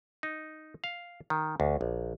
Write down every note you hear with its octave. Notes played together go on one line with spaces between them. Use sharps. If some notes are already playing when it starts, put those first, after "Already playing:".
D#4
F5
D#3
D2
A#1